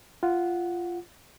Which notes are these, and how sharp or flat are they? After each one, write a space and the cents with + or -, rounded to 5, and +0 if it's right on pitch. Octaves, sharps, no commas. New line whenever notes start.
F4 -10 F#5 +0